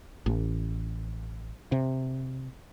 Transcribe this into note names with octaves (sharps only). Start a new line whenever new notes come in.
A1
C3